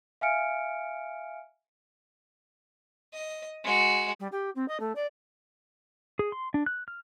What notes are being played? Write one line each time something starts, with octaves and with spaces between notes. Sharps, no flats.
E5 F5 G#5 F6 C#7 D7
D#5
G#3 F#4
G3
G4
C4
D#5
A3
D5
G#4
C6
D4
F#6
F6